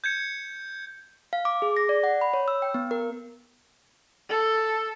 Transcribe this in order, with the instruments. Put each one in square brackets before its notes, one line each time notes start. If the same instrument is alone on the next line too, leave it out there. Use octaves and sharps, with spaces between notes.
[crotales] G6 G#6 C#7
[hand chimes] F5
D6
G#4
A#6
D5
F#5
B5
C#5
E6
G5
B3
A#4
[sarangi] A4